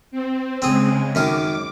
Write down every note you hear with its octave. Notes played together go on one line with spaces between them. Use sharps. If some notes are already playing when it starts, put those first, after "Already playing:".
C4
C#3 G#3 C4 G#4
F#2 D#3 A#4 D6